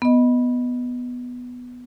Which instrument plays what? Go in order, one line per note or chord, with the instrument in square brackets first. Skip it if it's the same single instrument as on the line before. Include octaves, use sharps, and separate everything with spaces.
[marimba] B3 D#5